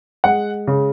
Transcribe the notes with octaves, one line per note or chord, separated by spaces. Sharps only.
G#3 F#5
C#3